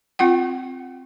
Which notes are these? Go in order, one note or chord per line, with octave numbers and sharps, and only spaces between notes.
C4 F4 F#5 G5